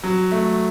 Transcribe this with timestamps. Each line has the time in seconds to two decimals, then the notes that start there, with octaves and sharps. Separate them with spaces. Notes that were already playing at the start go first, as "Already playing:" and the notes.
0.04 F#3
0.32 A3